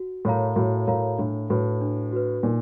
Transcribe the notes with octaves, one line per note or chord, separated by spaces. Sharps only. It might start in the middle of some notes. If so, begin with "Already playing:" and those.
Already playing: F#4
A2 A#4 C#5 F5 A#5
A2 F#4
A2 A#4 C#5 F5 A#5
A2 D4
A2 F#4 B4
D4
F#4 B4
A#2 D#4